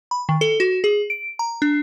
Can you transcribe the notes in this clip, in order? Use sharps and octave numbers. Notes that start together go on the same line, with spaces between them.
B5
D#3
A4
F#4
G#4
D7
A#5
D4